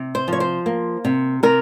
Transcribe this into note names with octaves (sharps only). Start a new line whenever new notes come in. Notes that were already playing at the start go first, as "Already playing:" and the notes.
Already playing: C3
C5
F3 C#5
C5
A#3
C3
C3 A#4